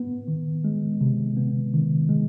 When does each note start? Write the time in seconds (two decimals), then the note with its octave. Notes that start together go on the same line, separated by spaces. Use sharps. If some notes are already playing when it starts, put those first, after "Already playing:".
Already playing: B3
0.28 D#3
0.64 G#3
1.01 C3
1.37 B3
1.74 D#3
2.09 G#3